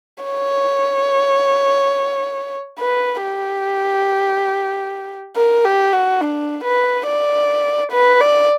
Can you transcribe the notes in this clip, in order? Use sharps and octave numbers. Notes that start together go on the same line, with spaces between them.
C#5
B4
G4
A#4
G4
F#4
D4
B4
D5
B4
D5